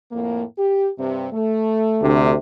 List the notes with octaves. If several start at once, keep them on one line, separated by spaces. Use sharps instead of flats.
F2 A2 A#3
G4
G2 C3
A3
D2 C3